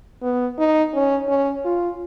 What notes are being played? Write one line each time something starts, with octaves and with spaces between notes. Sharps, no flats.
B3
D#4
C#4
C#4
F4